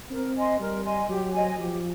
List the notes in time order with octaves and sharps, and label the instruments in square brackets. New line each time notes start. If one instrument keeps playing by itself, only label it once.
[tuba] C4 [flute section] A#4
[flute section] D#5 G#5 C6
[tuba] G3 [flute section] A#4
[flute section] D#5 G#5 C6
[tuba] F#3 [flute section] G4
[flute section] C5 D#5 G#5
[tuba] F3 [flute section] G4